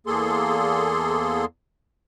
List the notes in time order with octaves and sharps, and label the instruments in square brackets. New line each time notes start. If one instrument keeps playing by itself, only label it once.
[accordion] E2 A#3 G#4 A4 C6